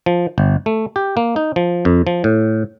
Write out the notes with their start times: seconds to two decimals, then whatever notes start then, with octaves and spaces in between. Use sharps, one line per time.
0.06 F3
0.38 G1
0.66 A3
0.96 G4
1.17 A#3
1.36 D#4
1.56 F3
1.85 F2
2.07 F3
2.24 A2